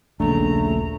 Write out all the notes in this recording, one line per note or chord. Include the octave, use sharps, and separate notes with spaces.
D#1 A#1 C#3 A3 D4 A#5